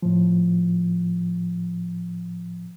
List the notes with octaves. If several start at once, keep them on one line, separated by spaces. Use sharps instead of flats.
A2 F3